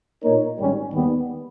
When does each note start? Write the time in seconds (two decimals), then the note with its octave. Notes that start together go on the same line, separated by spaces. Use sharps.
0.24 A#2 A#3 D#4 A#4 C#5
0.58 G#1 G#2 G3 C#4
0.93 D#2 D#3 G3 B3 G4